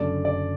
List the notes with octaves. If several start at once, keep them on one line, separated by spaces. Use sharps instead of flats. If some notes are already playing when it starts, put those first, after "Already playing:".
Already playing: F#1 F#2 D3 A3 D5
D5